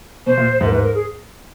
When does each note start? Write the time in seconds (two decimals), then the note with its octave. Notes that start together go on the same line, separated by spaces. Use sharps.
0.26 B2 C5
0.38 A#2
0.61 G#2
0.66 A#4
0.72 G#2 B4
0.83 A#4
0.95 G#4